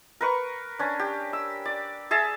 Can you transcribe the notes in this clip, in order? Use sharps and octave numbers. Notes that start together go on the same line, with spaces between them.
A#4 B4 C#6
C#4 D4
G4
E6
D5
G#4 E5 A5